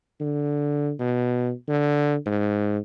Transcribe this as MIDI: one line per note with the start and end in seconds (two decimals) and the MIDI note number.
0.20 0.91 50
1.00 1.51 47
1.69 2.15 50
2.26 2.78 44